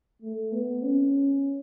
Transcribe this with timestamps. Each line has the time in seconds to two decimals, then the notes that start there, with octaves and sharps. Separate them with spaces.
0.22 A3
0.52 B3
0.83 C#4